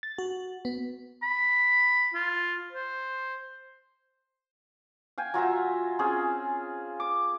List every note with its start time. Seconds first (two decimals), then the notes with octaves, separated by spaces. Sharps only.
0.03 A6
0.18 F#4
0.65 B3
1.23 B5
2.14 F4
2.73 C5
5.18 F5 G5 G#5
5.34 F#3 F4 E5 A#5
5.99 C4 C#4 F4 G#4
7.00 D6